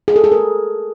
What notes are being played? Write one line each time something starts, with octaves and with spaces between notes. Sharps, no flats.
G#4
A4
G#4
A#4